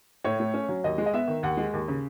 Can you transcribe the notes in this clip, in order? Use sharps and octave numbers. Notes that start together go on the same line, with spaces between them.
A2 C#5
A3
C#4
F#3
D#2 D#5
G#3
D#5
B3 E5
D#3
D#2 F#5
G#3
D#2
C#3